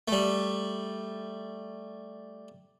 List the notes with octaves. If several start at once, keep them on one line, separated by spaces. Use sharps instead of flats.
G3 A3